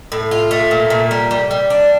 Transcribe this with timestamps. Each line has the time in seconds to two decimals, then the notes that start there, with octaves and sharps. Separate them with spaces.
0.12 A2
0.31 F4
0.51 A3
0.71 A#2
0.90 A#2
1.11 G3
1.31 G3
1.51 G3
1.70 D4